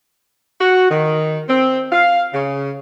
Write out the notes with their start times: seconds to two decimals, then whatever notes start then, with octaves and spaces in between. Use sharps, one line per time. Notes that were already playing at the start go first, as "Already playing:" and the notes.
0.60 F#4
0.90 D#3
1.48 C4
1.92 F5
2.33 C#3